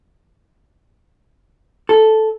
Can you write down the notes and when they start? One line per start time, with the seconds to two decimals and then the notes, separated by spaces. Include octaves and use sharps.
1.89 A4